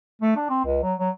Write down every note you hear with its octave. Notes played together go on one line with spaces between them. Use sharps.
A3
D4
C4
C#2
F#3
F#3